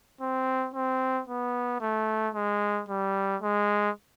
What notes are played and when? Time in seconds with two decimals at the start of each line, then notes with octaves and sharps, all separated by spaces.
0.21 C4
0.74 C4
1.28 B3
1.81 A3
2.34 G#3
2.88 G3
3.42 G#3